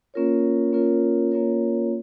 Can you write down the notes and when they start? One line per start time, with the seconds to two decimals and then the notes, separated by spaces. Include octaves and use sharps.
0.14 A#3 C#4 F4 A#4 C#5
0.73 A#3 C#4 F4 A#4 C#5
1.31 A#3 C#4 F4 A#4 C#5